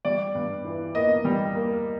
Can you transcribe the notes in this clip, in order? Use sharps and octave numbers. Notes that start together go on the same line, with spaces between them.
G3 D5
G2
E3
A#3 D#5
G3
A#3